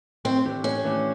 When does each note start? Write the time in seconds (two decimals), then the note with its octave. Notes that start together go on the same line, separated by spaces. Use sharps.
0.25 A2 C4
0.44 E3 A3 D4 G4
0.64 A2 C#4
0.84 E3 A3 D4 G4